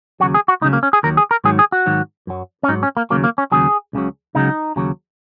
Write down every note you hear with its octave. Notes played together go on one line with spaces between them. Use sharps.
D#2 C#3 F#3 F#4
G#4
F#4
C#2 C#3 F#3 D#4
A#3
C#4
G#4
D#2 D#3 F#3 A#4
G#4
A#4
G#2 D#3 F#3 G#4
G#4
F#4
G#2 D#3 F#3
F#2 F#3
C#4
G#2 F#3 D#4
C#4
A#3
D#2 C#3 F#3 A#3
A#3
C#4
D#2 C#3 F#3 G#4
C#2 C#3 F#3
C#2 C#3 F#3 D#4
D#2 C#3 F#3